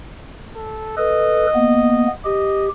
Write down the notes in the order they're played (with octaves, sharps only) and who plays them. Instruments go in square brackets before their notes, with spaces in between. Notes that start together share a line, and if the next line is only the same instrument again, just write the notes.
[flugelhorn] A4
[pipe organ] A4 B4 [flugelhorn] D#5
[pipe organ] A#3 B3
[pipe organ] G4 [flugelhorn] D#5